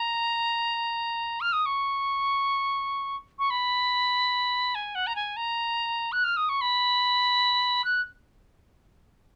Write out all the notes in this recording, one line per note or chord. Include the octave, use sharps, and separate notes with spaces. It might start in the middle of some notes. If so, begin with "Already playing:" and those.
Already playing: A#5
F6
D#6
C#6
C#6
B5
G#5
F#5
A#5
G#5
A#5
F#6
F6
D#6
C#6
B5
F#6